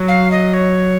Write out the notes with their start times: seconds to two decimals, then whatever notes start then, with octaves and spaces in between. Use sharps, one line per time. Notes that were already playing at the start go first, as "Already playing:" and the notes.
Already playing: F#3
0.08 F5
0.31 D#5
0.54 C#5